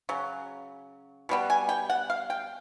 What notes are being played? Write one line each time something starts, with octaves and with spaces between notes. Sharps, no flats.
C#3 F#3
B2 G3 B3
G#5
G5
F#5
F5
G5